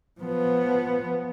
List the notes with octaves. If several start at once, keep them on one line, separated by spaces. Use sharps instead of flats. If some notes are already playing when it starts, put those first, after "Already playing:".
F3 B3